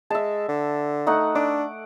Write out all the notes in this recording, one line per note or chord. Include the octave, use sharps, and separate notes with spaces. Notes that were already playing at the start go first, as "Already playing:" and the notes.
G#3 E5 A5
D3
A3 D#4 F#5
D4 D6